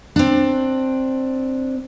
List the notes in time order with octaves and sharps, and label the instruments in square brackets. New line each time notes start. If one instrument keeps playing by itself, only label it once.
[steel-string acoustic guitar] C4 D4